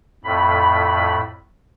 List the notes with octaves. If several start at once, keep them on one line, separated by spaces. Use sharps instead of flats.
F2 A2 B5